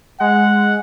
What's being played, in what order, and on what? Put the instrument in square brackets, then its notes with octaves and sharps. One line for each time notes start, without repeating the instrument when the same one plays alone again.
[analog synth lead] G#3 [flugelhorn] F#5